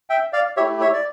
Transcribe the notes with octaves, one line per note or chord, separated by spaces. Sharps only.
E5 G5
D5 F5
A3 E4 G4 C#5 E5
C#5 E5
D5